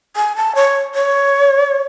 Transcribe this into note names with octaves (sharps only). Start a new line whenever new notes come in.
G#5
A5
C#5
C#5